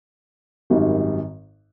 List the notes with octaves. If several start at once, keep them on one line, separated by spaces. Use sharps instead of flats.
G#1 F#2 D#3 G3